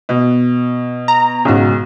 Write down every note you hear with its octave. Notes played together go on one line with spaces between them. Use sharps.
B2
A#5
B1 G#2 C#3 F#4